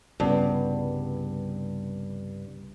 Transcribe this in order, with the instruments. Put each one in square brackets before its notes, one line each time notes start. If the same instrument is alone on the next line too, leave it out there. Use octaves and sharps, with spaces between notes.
[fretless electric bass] C2 C#3 B3 [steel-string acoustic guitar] G2